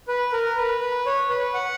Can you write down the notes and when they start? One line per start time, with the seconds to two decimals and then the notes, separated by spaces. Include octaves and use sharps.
0.08 B4
0.32 A#4
0.57 B4
0.80 B4
1.06 C#5
1.30 B4
1.54 F#5